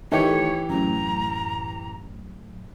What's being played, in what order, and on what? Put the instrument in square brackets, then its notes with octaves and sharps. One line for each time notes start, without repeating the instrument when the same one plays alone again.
[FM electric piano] D#3 A3 [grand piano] E3 G4 [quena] C#5
[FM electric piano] F#2 A2 [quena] A#5